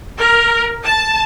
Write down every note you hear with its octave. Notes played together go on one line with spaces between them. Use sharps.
A#4
A5